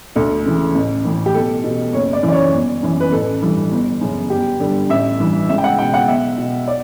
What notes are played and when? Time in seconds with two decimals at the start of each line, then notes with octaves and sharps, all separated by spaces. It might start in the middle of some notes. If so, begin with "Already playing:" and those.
0.16 D2 A4
0.45 C#3 E3
0.75 A1
1.05 A2 E3
1.26 G4
1.34 B1 A4
1.64 B2
1.93 F#1 C#5
2.13 D5
2.23 F#2 E3
2.28 D5
2.33 C#5
2.53 G1
2.82 F#2 E3
3.00 B4
3.12 A1 A4
3.42 G2 E3
3.72 G1
4.01 F#2 C#3
4.30 G1 G4
4.60 G2 D3
4.89 A1 E5
5.20 G2 E3
5.49 C#2 E5
5.58 G5
5.64 F#5
5.79 B2 G5
5.94 F#5
6.08 B1 E5
6.38 B2
6.68 D5